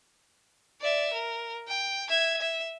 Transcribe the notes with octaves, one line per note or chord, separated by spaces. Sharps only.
D5 E5
A#4
G5
E5 G#6
E5